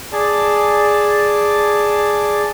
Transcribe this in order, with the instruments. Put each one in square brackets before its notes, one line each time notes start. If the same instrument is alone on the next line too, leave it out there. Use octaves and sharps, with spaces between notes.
[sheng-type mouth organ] G#4 D5 A5